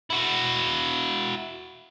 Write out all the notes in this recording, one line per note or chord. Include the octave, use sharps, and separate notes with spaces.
E4 F#4